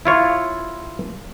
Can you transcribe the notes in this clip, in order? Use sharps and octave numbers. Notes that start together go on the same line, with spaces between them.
E4 F4 C#5